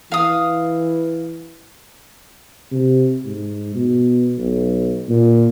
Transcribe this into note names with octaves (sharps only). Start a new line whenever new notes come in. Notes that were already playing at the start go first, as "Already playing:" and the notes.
E3 F5 D#6
C3
G#2
B2
B1
A#2